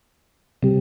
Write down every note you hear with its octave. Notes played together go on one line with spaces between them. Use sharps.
C3 G3